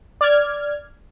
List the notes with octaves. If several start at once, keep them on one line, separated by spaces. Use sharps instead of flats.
D5 F6 G#6